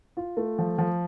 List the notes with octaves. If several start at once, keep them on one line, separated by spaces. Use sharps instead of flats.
F4
A3
F3
F3